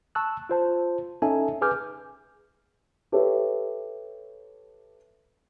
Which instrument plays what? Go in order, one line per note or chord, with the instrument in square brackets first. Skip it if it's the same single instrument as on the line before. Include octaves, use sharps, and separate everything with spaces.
[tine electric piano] A5 C#6 E6 F#6
F4 C5 A5
C#4 D#4 A4 E5 G#5 A5
G#4 B4 G#5 D6 F6 G6
[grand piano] G4 A4 B4 C#5 E5